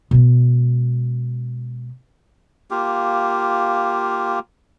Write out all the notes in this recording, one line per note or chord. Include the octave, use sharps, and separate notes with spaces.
B2 G#3
A#3 F4 G4